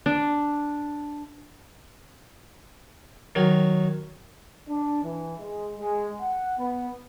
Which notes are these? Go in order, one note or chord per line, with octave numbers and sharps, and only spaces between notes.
D4
D#3 F#3
D4
E3
G#3
G#3
F#5
B3